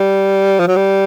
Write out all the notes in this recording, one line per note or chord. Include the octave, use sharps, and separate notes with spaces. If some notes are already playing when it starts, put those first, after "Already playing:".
Already playing: G3
F3
F#3
G3